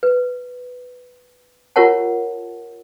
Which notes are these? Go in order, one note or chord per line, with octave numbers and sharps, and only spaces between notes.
B4
F4 G4 A#4 C#5 F#5 A5